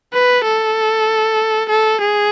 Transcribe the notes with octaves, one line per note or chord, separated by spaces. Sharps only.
B4
A4
A4
G#4